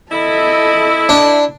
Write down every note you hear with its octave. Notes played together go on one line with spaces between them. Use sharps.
E4 A4 D#5
D4